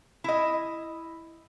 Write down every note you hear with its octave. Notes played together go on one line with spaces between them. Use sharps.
E4 D#5